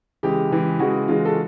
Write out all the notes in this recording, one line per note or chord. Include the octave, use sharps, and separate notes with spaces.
C#3 E3 G#3 G4
C#3 E3 G#3
C#3 E3 G#3 F#4
C#3 E3 G#3 F4
A4